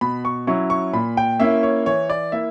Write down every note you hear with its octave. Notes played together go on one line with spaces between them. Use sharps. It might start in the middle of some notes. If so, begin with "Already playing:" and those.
B2 B5
C#6
F#3 C#4 E4 C#6
C#6
A#2 B5
G5
A#3 C#4 E4 E5
C#5
E3 C#5
D5
A#3 E4 E5